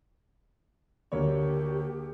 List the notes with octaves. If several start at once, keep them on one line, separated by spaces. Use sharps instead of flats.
D2 A#3 G4 C#5